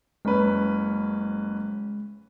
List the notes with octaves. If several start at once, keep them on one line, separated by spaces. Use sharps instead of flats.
F#1 G#3 C#4 B4